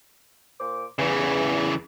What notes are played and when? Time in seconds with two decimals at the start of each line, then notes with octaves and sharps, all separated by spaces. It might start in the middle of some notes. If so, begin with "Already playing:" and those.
0.59 A#2 C5 D6
0.99 E2 C#3 E3